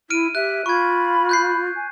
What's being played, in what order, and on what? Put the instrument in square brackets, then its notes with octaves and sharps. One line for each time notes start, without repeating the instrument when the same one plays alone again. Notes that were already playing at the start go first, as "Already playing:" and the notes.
[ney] E4 [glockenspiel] F6 D7 D#7
[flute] G4 [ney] E5 [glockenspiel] F#6
[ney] F4 [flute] B5 [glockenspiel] C#6 G#6
[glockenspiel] F#6 G6 C7
[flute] G#5